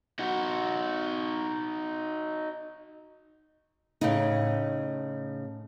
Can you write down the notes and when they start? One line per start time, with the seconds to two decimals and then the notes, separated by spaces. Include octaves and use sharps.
0.19 D#4 F#4
4.01 A2 C#3 D#4